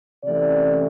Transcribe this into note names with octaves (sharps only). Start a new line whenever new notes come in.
C3 E3 A3 C#4 D5